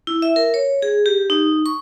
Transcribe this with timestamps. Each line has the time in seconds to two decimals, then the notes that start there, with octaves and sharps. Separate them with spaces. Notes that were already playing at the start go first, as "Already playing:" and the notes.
0.07 E4
0.22 E5
0.36 A#4
0.54 C#5
0.82 G#4
1.06 G4
1.30 D#4
1.66 C#6